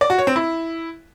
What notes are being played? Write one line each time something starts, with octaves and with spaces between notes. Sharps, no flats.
D5
F#4
C#5
C4
E4